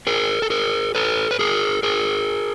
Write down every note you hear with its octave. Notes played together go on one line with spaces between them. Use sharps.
G#4 A#4
A4
G#4 A#4
A4 B4
B4
G#4 A#4
G#4 A#4